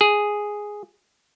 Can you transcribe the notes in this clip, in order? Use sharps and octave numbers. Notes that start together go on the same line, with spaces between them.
G#4